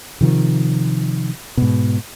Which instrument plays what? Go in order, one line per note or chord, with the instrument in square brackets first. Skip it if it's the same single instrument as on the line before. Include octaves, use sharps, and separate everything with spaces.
[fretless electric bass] C3 D#3 F3
G#2 B2